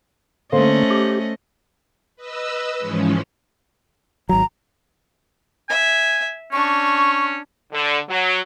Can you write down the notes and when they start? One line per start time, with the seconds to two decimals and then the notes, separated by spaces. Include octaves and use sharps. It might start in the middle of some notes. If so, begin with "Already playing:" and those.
0.52 D3 A3 A#3 C#4 C5 D#5
0.90 G4
2.16 B4 D#5 E6
2.78 G#2 E3 F3 G#3 C#4
4.29 G#1 F#3 A#5
5.69 E5 G#5
6.52 C#4 D4 C#6
7.72 D3
8.09 F#3